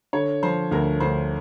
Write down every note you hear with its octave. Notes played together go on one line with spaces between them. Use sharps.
D3 C#5
F3 C5
D2 A#4
D2 C5